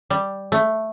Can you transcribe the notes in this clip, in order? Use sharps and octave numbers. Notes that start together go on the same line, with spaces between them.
G3
A3